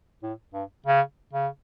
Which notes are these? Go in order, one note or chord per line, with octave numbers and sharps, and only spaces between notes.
A2
G2
C#3
C#3